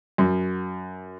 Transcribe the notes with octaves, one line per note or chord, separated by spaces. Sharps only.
F#2